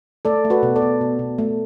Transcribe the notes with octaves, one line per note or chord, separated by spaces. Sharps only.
A3 A4 D5
A3
F#4 B4
B2
A4 D5
B2
B2
B2
A3